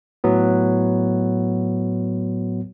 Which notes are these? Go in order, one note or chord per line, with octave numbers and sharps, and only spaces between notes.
A2 F#3 B3